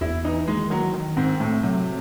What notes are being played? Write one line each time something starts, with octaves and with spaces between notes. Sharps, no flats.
E2 E4
E3 D#4
D#3 G#3
D#3 F#3
D#3
G#2 C4
A2 A3
C3 F#3